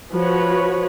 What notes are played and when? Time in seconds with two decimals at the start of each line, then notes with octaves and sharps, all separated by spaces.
0.13 F3 F#4 B4 C#5